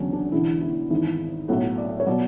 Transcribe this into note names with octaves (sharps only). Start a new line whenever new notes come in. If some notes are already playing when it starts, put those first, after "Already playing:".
Already playing: F#1 E2 D3 F#3 C#4 D4
D4
E1 E2 D3 E4
E4
G#1 G#2 E3
B1 A2 F#3 F#4
D5
C#5
B2 F#3 D5